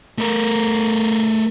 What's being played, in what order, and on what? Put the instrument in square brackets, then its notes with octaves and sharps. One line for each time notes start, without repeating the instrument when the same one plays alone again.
[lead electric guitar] A3 A#4